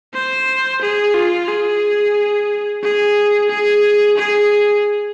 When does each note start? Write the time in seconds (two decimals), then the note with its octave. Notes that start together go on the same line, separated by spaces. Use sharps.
0.14 C5
0.81 G#4
1.15 F4
1.48 G#4
2.83 G#4
3.50 G#4
4.17 G#4